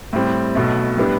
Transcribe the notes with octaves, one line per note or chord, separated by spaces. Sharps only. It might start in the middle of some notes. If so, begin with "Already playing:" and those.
A2 G3 C4
B1 B2 A3
A2 G3 B3 D4 G4